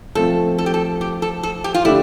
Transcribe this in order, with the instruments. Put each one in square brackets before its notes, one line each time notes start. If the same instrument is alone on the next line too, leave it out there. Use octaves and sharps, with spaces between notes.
[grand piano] F3 A3 C4 [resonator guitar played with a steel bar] A4
[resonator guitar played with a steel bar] A4
G4
A4
G4
A4
A4
G4
F4
[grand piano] D3 A3 D4 G4 [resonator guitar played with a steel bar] E4